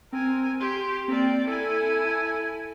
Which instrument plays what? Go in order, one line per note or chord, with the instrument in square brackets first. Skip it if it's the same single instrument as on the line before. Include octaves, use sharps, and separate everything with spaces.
[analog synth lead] C4 [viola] A#4 G#5
[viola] G4 [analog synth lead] C6
[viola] A#3 D5 [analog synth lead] C4
[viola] E4 G#5 [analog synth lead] A4